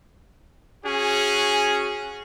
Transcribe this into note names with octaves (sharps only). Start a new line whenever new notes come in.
C#4 F#4 G#4